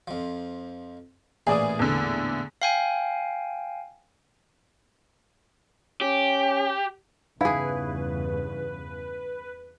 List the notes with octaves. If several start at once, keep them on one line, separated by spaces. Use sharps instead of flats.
F2 F3
A1 A#2 E3 G#4 D5 D#6
E2 D3
F5 G5 G#5
C#4 G4
E2 G2 C#3 D#4 E4 G#4 B4 F5